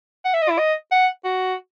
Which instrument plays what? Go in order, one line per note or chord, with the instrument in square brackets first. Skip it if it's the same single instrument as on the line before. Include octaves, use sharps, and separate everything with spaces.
[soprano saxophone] F#5
E5
D#5
E4
D#5
F#5
F#4